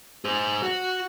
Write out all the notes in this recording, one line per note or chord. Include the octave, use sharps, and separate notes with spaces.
G#4 C5
F#4